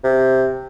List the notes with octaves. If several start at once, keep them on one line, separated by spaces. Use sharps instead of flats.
C3